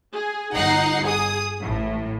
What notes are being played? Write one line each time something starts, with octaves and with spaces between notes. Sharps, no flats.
G#4
G1 D#4 F#5 A#5 C7
G#4 D#6
A1 A2